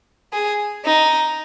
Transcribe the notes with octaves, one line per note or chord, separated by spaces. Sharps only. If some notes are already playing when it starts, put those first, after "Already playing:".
G#4
D#4